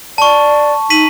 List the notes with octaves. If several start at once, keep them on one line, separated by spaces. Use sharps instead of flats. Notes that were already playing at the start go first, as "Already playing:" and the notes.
D5 A5 C#6
D#4 B6 D#7 F#7